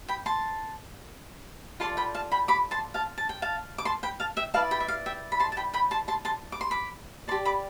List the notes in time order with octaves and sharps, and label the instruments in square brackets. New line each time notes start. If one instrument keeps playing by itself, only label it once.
[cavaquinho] G5 B5
A5 C6
F4 A4 D5 A5 C6
G5 B5
F5 A5
G5 B5
B5 D6
A5 C6
F5 A5
A5
G5
F5 A5
D6
A5 C6
G5 B5
F5 A5
E5 G5
E4 B4 D5 F5 A5
G5 B5
E5
F5
E5 G5
B5
A5 C6
A5
G5 B5
G5 B5
A5 C6
A5 C6
A5 C6
D6
C6
B5 D6
D5 A5 C6
G4
B5 D6